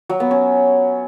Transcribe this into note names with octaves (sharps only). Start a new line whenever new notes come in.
F#3
B3
C#4